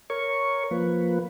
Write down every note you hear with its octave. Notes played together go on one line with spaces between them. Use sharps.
A#4 C#5 C#6
F3 A#3 B4